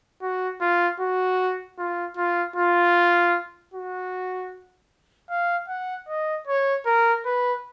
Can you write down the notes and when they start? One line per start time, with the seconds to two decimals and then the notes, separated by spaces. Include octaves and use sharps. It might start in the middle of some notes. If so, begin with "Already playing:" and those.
0.21 F#4
0.61 F4
1.00 F#4
1.78 F4
2.17 F4
2.56 F4
3.74 F#4
5.30 F5
5.68 F#5
6.08 D#5
6.47 C#5
6.86 A#4
7.25 B4